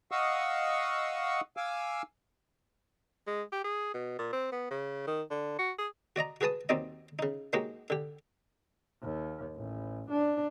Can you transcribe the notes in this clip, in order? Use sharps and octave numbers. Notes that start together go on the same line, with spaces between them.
D#5 F5 F#5 C#6 D#6 E6
F5 G#5 D6 E6
G#3
G4
G#4
B2
A#2
C4
B3
C#3
D#3
D3
F#4
G#4
F#4 D5 D#5 A#5
F#4 G#4 B4 A5 D#6
D#2 F#3 C4 D#4 D5 D#5
C#3 D#4
F#3 G#3 A#3 D#4 F#4 G4
D3 G4
D#2
A1
D4